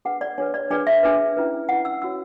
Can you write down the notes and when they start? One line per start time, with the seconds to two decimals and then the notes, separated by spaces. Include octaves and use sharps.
0.05 D4 G#4 B4 F#5
0.21 D5
0.38 D4 G#4 B4 C#5
0.54 D5
0.70 D4 G#4 B4 D5
0.87 E5
1.03 D4 G#4 B4
1.37 C#4 E4 B4
1.69 C#4 E4 B4 F#5
1.85 E6
2.02 C#4 F#4 C#5 E6